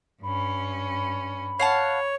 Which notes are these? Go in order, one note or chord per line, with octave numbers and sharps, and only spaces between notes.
G2 C#4 B5
C#5 F5 F#5 A5